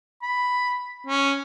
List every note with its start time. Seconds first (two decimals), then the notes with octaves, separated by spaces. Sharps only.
0.22 B5
1.07 C#4